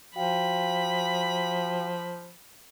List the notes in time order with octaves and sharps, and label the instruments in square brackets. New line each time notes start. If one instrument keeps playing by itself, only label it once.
[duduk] F3 [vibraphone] F#4 F5 G5 [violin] B5